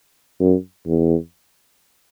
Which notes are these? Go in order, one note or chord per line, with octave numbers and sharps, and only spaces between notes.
F#2
E2